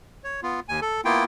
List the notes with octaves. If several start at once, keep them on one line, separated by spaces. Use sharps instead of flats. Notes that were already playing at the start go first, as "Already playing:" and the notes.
C#5
B3 F4
D#2 G#5
A4
A#3 B3 E4 F4 G5